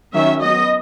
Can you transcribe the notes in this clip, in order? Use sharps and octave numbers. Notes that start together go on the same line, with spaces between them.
D#3 F#3 C#4 E5
F#3 B3 D#5